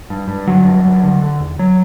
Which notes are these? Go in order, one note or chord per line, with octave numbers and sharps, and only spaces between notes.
G2
G2
D3 F#3
G2
G2
D3
D3
E2
F#3